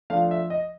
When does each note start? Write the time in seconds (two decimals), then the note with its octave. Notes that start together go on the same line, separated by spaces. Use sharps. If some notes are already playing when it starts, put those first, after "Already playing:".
0.10 F3 A3 D4 F5
0.31 E5
0.50 D#5